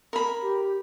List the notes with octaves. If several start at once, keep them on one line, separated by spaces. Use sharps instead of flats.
A#4 B5
G4